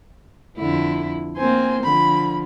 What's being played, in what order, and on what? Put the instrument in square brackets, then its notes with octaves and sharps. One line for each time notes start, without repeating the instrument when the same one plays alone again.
[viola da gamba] F2 D3 E4
[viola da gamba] A#3 C4 C5 [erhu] G#5
[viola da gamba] D3 F3 [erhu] B5